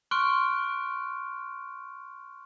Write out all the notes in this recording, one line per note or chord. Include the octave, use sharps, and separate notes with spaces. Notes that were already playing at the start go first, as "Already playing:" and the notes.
C6 C#6 F6 F#6 D7